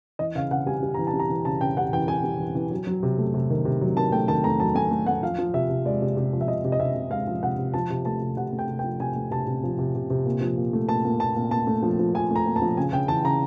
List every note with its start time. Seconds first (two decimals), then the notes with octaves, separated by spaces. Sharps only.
0.19 E3 D#5
0.35 C#3 F5
0.50 C#3 F#5
0.66 G3 G#5
0.83 G3
0.94 E3 A#5
1.07 A5
1.14 G3
1.20 A#5
1.30 E3
1.45 C#3 A5
1.61 C#3 G5
1.77 G3 F#5
1.93 E3 G5
2.08 G3 G#5
2.24 G3
2.39 E3
2.55 E3
2.71 F#3
2.87 F#3
3.03 C3
3.18 A3
3.34 C3
3.50 D#3
3.65 C3
3.81 F#3
3.96 D#3 A5
4.12 A3 G5
4.28 D#3 A5
4.44 A3 A#5
4.60 F#3 A5
4.75 A3 G#5
4.91 A3
5.06 A3 F#5
5.23 F3 F5
5.39 F3
5.53 C3 E5
5.69 C3
5.85 G#3 D5
6.02 C3
6.17 C3
6.33 F3
6.41 E5
6.48 C3 D#5
6.64 C3
6.72 D#5
6.80 C3 E5
6.95 C3
7.11 G#3 F5
7.27 F3
7.43 C3 F#5
7.58 C3
7.74 F3 A5
7.90 C3
8.05 A3 A5
8.21 C3
8.37 C3 F#5
8.53 A3
8.59 G5
8.68 C3
8.79 G5
8.84 F3
9.00 C3 G#5
9.16 A3
9.31 C3 A5
9.47 C3
9.63 F3
9.79 C3
9.95 C3
10.10 C3
10.26 A#2
10.41 F3
10.57 A#2
10.73 A3
10.88 A#2 A5
11.05 A#2
11.20 A#2 A5
11.36 A#2
11.51 A#2 A5
11.67 A3
11.83 F3
11.99 F3
12.14 F3 G#5
12.31 A3 A#5
12.46 A#2
12.56 A5
12.62 F3
12.77 C#3 G#5
12.92 C#3 G5
13.08 E3 A5
13.24 C#3 A#5